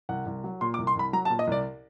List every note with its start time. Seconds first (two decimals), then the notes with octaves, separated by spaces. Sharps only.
0.09 C2 F#5
0.26 C2
0.44 F#3
0.61 A#2 C6
0.74 D6
0.78 C2
0.87 C6
0.96 C2 B5
1.13 F#3 A#5
1.25 A5
1.30 A#2
1.39 D#5
1.47 C2 D5